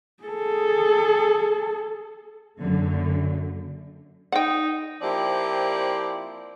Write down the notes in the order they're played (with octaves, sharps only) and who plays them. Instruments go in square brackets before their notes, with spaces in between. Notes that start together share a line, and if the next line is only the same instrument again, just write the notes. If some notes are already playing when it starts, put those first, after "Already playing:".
[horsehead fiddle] G#4 A4
[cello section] F#2 D3 A#3
[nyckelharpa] D#4 [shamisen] F#5 G5
[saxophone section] F3 A#3 C4 E4 G4 D5